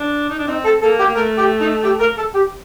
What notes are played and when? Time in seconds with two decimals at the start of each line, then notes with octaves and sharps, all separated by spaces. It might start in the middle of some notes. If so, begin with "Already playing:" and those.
Already playing: D4
0.29 D#4
0.39 D4
0.48 C4 D#4
0.65 A4
0.82 A#3 A4
0.99 G4
1.07 A#3
1.15 A3 A#4
1.38 G4
1.61 D#4
1.84 G4
2.00 A#4
2.18 A4
2.34 G4